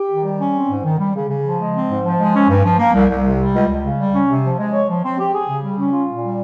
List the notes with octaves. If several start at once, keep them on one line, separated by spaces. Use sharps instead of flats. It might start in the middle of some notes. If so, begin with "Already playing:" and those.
Already playing: G4
D#3
G3
C#4
C4
G#2
D#3
G3
C#3
C#3
F3
G#3
C4
G#2
F3
G#3
C#4
G2
F3
A#3
C2
C2
C3
G3
C#2
C#2
C#3
G3
C#4
C3
F3
G#3
C#5
F3
C4
G4
G#4
C#3
G3
C#4
F4
A#2
G3